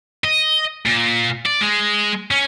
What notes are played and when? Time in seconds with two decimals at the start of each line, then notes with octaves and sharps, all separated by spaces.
0.24 D#5
0.86 A#2
1.46 D5
1.61 G#3
2.31 C#4